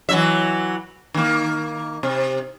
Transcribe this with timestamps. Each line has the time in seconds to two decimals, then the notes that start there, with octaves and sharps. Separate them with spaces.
0.09 E3 F#3 E5
1.14 D#3 A#3
2.03 C3